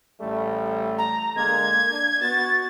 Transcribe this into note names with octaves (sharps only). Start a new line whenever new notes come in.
A1 G3 A3
A#5
D3 G#3 A#3 G#6
D4
B3 F#4 A6